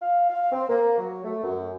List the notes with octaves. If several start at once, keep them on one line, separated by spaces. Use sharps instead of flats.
F5
F5
C4
A#3
F#3
A3
F#2